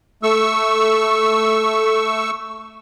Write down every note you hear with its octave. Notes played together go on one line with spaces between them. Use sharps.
A3 C#6 E6